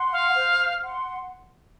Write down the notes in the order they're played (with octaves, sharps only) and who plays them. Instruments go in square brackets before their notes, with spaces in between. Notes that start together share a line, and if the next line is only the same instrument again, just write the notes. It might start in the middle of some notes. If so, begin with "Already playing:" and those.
Already playing: [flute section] F#5 C6
[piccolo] F5
[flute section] C5
F#5 C6